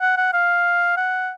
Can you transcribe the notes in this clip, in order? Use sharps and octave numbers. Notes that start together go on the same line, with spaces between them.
F#5
F#5
F5
F#5